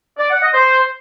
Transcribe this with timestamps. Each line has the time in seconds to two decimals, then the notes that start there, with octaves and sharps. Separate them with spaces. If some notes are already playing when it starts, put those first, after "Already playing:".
0.18 D5
0.30 F#5
0.42 D#5
0.54 C5